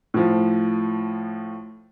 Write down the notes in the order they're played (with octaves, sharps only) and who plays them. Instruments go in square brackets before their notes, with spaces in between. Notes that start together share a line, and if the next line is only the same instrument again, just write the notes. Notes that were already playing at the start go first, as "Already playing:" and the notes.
[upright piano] A2 F3